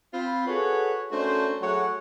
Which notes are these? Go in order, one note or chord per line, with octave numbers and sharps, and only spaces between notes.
C4 F4 B5
F#4 G#4 A4 B4 C#5 F#5
A3 C#4 D4 F#4 A#4 C5
F#3 A3 G#4 C#5 F#5